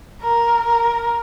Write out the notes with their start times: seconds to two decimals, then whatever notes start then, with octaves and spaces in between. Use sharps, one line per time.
0.21 A#4
0.66 A#4